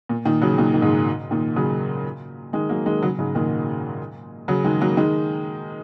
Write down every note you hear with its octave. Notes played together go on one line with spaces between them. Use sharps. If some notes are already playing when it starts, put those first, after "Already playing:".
A#2
A#2 D#3
C#3 F#3
A#2 D#3
D#3
G#2 C#3
A#2 D#3
C#3 F#3
D#3 G#3
F#3 A#3
D#3 G#3
C#3 F#3
G#2 C#3
A#2 D#3
C#3 F#3
D#3 G#3
F#3 A#3
D#3 G#3